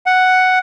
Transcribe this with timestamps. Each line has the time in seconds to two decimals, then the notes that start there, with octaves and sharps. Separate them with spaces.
0.06 F#5